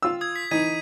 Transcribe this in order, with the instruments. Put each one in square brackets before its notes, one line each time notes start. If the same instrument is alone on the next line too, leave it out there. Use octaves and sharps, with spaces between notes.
[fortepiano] F4 E6
[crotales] D#6 G#6
B6
[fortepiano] E3 D#4 [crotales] G#6 B6 D#7